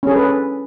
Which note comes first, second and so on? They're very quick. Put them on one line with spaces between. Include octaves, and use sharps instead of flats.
C#4 G#4 A4 B4